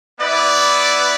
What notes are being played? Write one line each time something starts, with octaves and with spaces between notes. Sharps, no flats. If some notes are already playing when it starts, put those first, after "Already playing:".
B3 E4 B4 D5